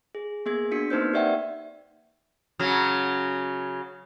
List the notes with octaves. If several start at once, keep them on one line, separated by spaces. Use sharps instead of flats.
G#4
A#3 B3 G#4 G#6
B3 D4 F#4 B6 C#7
A#3 C4 D#4 B4 C5 G6
G4 D5 E5 F#5 G5
C#3 F#3